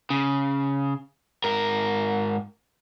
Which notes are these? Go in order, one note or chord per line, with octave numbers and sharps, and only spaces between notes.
C#3
G#2 A#4